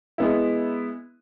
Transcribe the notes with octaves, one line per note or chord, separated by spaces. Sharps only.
G#3 B3 E4